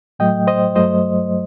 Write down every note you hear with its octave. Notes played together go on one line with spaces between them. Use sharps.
A2 F#3 A3 D#5 G5
C5 D#5
G2 F#3 A3 C5 D#5